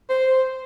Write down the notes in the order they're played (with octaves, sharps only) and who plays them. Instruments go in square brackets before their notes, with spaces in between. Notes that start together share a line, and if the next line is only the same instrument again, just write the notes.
[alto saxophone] C5